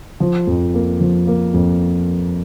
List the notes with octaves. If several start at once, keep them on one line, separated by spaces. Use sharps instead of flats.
F3
F2
A#3
F3
A#3
F2